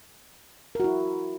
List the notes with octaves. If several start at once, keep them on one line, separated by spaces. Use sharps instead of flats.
E4 F#4 A#4